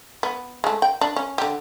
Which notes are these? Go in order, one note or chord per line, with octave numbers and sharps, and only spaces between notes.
B3
G#3 A3
G5
D4
C#4
D3 G4